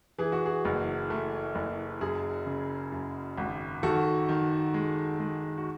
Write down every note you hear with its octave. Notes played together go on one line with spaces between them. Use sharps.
E3 G#4
F#4
G#4
F#1
A3
F#1
F#2 G#4
C#3
F#2
G#1
D#3 F#4 A4
D#3
G#3
G#3
F#4